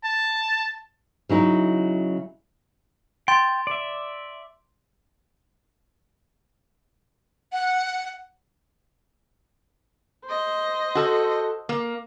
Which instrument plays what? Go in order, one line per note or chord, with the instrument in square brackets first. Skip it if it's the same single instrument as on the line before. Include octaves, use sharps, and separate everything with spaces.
[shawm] A5
[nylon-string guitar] C#3 F#3 D#4 E4
[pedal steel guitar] G5 [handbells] C6 A6
[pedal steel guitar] D5 E5
[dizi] F#5
[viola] C5 D#5
[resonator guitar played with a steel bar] F#4 A4
A#3